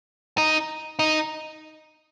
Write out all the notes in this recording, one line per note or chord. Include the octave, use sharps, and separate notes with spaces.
D#4
D#4